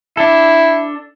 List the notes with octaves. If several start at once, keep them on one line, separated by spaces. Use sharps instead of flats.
D4 E4 A4